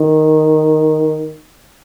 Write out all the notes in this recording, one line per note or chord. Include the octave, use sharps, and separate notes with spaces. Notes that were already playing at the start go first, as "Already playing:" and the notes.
Already playing: D#3